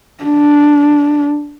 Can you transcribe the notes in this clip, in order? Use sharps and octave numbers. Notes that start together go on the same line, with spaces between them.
D4